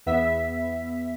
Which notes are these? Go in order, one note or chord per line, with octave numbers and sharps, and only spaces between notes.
E2 B3 E5 B6